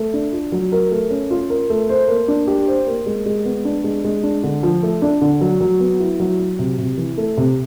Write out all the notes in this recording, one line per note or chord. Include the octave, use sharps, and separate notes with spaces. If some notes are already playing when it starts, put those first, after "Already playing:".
Already playing: A3
D4
F4
F#3
A#4
A3
C#4
F4
A#4
A3
C5
A#3
D4
G4
C5
A#3
G#3
G#3
B3
D4
G#3
G#3
D4
D3
F3
A3
D4
D3
F#3
F#3
B3
E4
F#3
F#3
C3
C3
E3
A3
C3